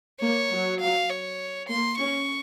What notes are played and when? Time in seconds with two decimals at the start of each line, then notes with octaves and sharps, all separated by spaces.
0.21 A#3 C#5
0.50 F#3
0.80 F5
1.10 C#5
1.69 A#3 C6
1.98 C#4 C#6